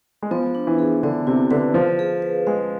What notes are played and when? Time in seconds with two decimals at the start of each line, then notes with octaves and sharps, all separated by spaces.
0.22 G#3
0.31 F3 B3
0.55 D4
0.67 E3
0.79 G#4
1.03 D3 B3
1.27 C3 E4
1.51 D3 B4
1.74 F3 F5
1.99 G#4
2.22 B4
2.47 G#3 F5